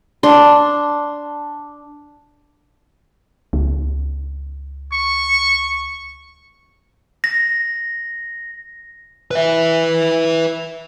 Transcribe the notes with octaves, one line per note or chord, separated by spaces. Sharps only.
D4 C6
C#2
C#6
A#6
B4 E5